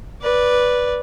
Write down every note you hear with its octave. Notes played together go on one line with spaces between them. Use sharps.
B4 D5